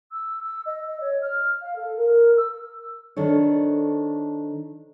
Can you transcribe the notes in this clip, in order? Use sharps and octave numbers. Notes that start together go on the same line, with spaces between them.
E6
E6
D#5
C#5
F6
F5
A4
A#4
E6
D#3 D4 A4 C5 C#5